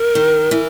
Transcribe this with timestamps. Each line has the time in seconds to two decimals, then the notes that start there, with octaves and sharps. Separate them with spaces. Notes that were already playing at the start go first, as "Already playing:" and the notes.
Already playing: A#4
0.15 D#3
0.51 E3